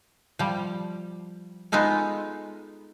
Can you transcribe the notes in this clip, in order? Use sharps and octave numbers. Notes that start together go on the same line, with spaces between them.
F3 G3
G#3 B3 D#4 F4 A4